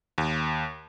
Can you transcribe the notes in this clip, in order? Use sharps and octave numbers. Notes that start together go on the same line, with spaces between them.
D#2